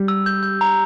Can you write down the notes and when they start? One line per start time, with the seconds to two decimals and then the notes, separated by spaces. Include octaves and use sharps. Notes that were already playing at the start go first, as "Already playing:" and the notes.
Already playing: G3
0.08 E6
0.26 G6
0.43 G6
0.61 A#5